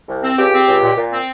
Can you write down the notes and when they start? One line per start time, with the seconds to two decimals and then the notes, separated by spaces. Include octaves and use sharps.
0.08 C2
0.23 C4
0.37 C#2 G4
0.52 C4
0.67 C#2
0.82 A#2
0.97 A#2
1.11 C4